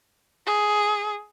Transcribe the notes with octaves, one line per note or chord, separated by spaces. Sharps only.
G#4